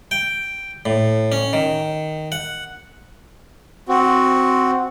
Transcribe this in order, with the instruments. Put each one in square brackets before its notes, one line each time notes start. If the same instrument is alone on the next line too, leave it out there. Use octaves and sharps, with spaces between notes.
[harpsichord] G5
A2
C#4
D#3
F#5
[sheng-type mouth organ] C4 F#4